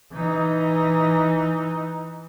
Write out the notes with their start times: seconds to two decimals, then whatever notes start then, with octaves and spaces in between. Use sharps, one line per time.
0.13 E3 D#4